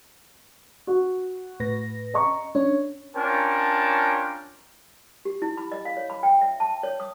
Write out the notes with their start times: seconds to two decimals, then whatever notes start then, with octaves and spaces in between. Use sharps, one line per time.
0.87 F#4
1.60 A2 B4 A#6
2.14 D#5 A#5 C#6
2.55 C#4 D4 C#5
3.16 C#4 D4 F4 A#4 G5 A5
5.25 G4
5.42 E4
5.57 B5
5.72 D#5
5.85 F5
5.97 C#5
6.10 B5
6.23 G5
6.41 E5
6.60 A5
6.83 C#5
7.00 D#6